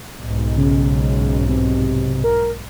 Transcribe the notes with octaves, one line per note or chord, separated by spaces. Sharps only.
B1 G#2
C#3
C3
A#4